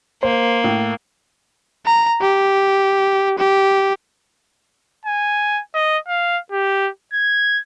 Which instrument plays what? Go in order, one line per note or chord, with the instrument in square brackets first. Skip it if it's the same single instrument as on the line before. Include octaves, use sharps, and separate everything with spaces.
[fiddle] A#3 [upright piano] C5
[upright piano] A2
[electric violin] A#5
G4
G4
[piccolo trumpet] G#5
D#5
F5
G4
G#6